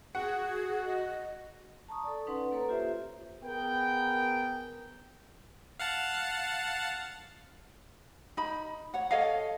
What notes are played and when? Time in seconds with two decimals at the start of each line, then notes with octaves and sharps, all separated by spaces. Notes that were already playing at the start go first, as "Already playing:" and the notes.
0.15 F#4 G#4 F#5
0.85 D#5
1.88 A5 A#5 C#6 D#6
2.04 A4 D5
2.27 C#4 D#4 B4 F#5 C6
2.51 A#3 A4 B4 C#5 A#5
2.68 A#3 F4 G4 C5 E5
3.44 B3 G#4 A#4 G5
5.79 F5 F#5 A5
8.37 D#4 B5
8.94 C#5 F#5
9.11 A4 C#5 D#5 F5